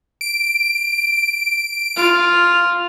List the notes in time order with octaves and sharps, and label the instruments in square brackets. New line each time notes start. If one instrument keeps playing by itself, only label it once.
[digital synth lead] D7
[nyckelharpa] F4